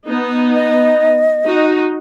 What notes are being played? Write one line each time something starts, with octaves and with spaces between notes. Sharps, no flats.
B3 D#4
D#5
D#4 F#4